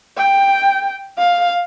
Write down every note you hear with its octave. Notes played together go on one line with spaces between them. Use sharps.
G5
F5